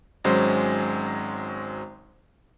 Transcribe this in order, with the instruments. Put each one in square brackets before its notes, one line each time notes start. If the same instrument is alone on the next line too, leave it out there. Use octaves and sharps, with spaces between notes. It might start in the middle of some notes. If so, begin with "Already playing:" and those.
[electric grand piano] G#1 F#3 G#3 C#4 C5